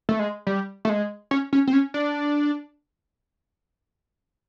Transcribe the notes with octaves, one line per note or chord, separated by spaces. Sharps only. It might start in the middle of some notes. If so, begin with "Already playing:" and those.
A3
G#3
G3
A3
G#3
C#4
C#4
C4
C#4
D4